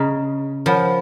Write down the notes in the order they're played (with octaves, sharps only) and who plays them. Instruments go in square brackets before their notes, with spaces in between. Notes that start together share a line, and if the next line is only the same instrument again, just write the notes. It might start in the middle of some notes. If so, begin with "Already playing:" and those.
Already playing: [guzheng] C#3 [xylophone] G#4 D#5 A#5 F6
[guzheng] F3 [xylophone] A#4 C#5 F#5 B5